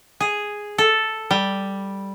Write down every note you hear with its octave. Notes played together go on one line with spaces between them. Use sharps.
G#4
A4
G3